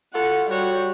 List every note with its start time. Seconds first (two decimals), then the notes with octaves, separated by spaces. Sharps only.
0.14 F4 F#4 A4 F#5
0.50 G3 F#4 C#5